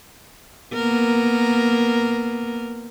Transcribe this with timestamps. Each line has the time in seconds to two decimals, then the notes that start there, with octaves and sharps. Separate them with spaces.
0.73 A#3 B3 A#4